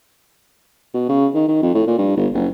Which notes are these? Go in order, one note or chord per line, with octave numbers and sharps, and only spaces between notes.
B2
C#3
D#3
D#3
F2
A2
A#2
G2
G1
F#1